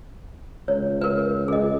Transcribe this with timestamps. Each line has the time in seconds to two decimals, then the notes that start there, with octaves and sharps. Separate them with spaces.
0.68 C#2 C#5
1.01 A#4 B4
1.48 C#2 G#4 D#5